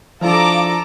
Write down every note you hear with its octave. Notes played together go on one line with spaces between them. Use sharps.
F3 D4 E4 A4 F5 A#5 D6